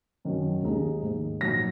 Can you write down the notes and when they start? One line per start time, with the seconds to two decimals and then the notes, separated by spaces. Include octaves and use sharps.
0.25 F#2 D#3 F#3
0.63 D#2 D#3 G#3 D#4
1.02 G#2 D#3 A#3
1.41 A#2 F#3 D#4 A#6